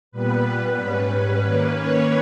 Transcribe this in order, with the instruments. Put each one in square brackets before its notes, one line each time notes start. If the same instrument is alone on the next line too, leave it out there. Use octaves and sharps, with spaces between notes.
[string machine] A#2 G3 B3 B4
B4
G#2 G3 C#4
D#3 A#3 C#4 B4
C#5